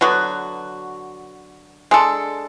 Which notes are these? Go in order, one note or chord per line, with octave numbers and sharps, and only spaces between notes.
D3 F#3 B3 F#4
G#3 D4 A4